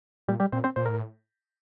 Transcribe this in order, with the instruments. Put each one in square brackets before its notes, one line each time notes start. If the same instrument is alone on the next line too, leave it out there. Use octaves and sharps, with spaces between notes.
[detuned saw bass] A#2 [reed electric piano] G3 G4
[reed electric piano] G3 G4
[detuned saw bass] A#2 [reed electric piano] C4 C5
[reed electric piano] C4 C5
[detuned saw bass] A#2 [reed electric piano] C5
[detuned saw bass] A2 [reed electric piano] A#4